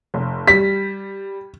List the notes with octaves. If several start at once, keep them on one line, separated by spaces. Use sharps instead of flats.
F1
G3 B6